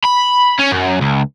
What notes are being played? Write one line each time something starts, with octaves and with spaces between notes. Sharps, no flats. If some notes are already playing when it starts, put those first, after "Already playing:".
B5
C#4
F#2
C#2